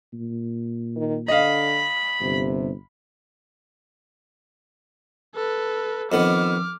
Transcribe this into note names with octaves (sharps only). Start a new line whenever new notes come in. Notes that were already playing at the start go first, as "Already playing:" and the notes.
A#2
D#3
D3 D#5 F5 B5
G1 C3
A4 B4
F2 D#3 B3 D6 F6